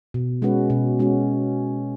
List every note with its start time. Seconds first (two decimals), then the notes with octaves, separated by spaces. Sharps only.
0.14 B2
0.42 G#3 C#4 F#4 B4
0.70 B2
0.99 G#3 C#4 F#4